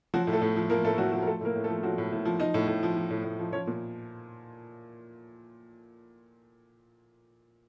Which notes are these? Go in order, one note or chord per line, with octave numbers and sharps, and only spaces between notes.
F3 F#3 F#4
A2
A3 A4
A2
F3
F3 A#3 A#4
A2 A3 A4
A2 F#3 F#4
F3 F#3 F#4
A#4
F3 A3 A4
A2 A#3 A#4
A2
A3 A4
F3
F3 F#3 F#4
A2
A2
F3
F3 D#4 D#5
A2
A2
F3
F3
A2
A2
F3
F3 C#4 C#5
A#2